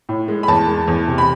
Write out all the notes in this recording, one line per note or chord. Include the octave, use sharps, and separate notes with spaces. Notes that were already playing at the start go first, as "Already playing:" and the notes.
A2
G#3
B5
E2 A5
G#3
E2
C3
B5